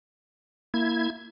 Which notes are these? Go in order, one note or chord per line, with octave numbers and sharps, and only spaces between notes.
A#3 E4 G#6